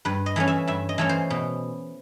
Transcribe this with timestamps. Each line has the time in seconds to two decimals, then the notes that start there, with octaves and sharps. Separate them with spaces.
0.05 G2 B4
0.26 D#5
0.36 E3 A3 C#4
0.48 E5
0.67 G2 E5
0.89 D#5
0.98 E3 A3 C#4
1.09 C5
1.30 B2